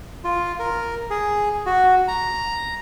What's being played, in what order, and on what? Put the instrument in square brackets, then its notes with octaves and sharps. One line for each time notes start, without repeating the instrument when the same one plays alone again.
[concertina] F4
A#4
G#4
F#4
A#5